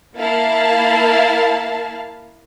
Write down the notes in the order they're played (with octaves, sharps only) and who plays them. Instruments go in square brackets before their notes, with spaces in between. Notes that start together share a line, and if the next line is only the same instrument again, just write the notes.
[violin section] A#3 E4 F5 A5